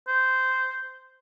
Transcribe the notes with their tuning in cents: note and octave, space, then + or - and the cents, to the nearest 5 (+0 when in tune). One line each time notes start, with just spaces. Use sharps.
C5 -10